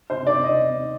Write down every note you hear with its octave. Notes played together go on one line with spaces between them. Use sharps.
C5
D5
D#5